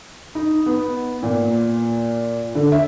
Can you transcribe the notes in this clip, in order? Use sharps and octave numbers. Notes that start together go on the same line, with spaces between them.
D#4
B3
A#2
D3
E5